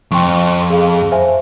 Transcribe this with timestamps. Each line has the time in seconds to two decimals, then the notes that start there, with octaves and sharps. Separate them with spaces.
0.11 F2 G5 C6 C#6
0.70 G#4 F5
1.12 C5 E5 G#5